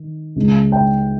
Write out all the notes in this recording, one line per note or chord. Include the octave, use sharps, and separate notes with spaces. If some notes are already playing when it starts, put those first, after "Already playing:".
Already playing: D#3
C#2 C#3 G#3
G5